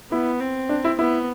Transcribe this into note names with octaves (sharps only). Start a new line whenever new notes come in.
B3 E4
C4
D4
E4
B3 E4